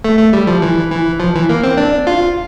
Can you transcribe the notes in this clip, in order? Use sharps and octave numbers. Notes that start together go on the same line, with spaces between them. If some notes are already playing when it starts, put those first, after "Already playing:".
A3
A3
G3
F3
E3
E3
F3
E3
A#3
C4
D4
F4